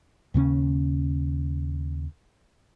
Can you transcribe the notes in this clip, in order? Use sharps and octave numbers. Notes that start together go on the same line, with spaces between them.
D#2 C#3 G#3 C#4